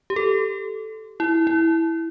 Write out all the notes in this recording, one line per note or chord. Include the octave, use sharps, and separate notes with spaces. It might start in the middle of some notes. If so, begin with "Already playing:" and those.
G4
A4
E4
E4